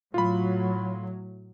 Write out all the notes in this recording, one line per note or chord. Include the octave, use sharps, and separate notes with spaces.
A2 F#3 F4 B5